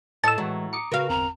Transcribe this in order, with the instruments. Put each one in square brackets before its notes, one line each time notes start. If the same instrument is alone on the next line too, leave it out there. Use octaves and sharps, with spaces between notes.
[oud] A2 A4 D#5 [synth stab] A5 E6
[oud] A2 F#3 [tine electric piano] E3 G#3
[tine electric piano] A#5 D6 D#6 [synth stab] C#7
[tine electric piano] C#3 B4 [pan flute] F#4 [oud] A#4 F5
[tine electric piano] G1 E2 C4 [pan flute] A#5